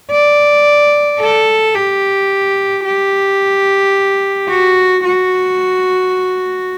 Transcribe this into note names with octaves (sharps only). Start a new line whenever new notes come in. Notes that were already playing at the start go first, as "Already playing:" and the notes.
D5
A4
G4
G4
F#4
F#4